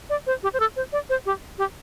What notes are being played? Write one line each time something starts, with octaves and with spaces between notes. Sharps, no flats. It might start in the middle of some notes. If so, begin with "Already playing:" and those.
D5
C5
G4
C5
A4
C5
D5
C5
G4
G4